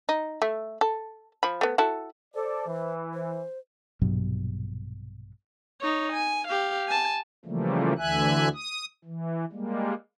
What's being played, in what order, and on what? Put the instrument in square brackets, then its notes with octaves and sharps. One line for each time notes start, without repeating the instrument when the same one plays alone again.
[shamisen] D#4
A3 E5
A4
F3 B5
A3 B3
E4 F#4 A4
[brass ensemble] A4 D5 [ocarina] C5
[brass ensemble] E3
[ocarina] C5
[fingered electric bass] A#1 G2 B2 F#3
[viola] D#4 C#5
G#5
G4 F5
G#5 A5
[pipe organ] C#3 E3 F3 G3 A3 A#3
D2 D3 E3 E5 G#5 F#6
D#6
E3
G3 G#3 A#3